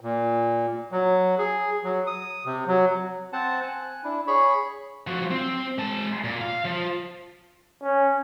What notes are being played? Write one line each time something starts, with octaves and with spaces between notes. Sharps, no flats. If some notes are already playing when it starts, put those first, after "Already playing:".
A#2
F#3
G#4
F#3
D#6
C3
F#3
C4 C5 F#5 A5
G#5 F#6
D4 E4
G#4 C#5 B5 C#6
F3 F#4
C4
G#3 A5
A#2
F5
F3
C#4